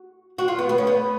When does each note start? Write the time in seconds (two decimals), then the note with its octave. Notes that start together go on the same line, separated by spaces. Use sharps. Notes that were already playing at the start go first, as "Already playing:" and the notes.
Already playing: F#4
0.38 F#4
0.48 F4
0.58 B3
0.69 B3
0.78 C#4
0.87 B3